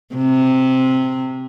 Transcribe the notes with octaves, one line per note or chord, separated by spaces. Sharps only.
C3